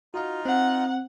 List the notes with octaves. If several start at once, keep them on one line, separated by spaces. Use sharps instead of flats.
D#4 F4 F#4 F5
C4 F#5